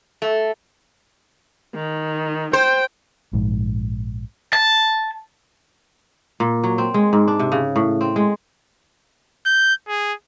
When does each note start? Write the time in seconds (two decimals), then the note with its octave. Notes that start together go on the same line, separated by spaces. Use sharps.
0.22 A3
1.73 D#3
2.53 C5 G5
3.33 A#1 G#2
4.53 A5
6.40 A#2
6.64 F#3
6.78 C4
6.94 G#3
7.13 G#2
7.28 D4
7.40 C3
7.52 C#3
7.76 A2
8.01 C4
8.16 G#3
9.46 G6
9.88 G#4